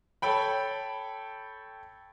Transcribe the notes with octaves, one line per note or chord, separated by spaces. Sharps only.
A4 C#5 G5 B5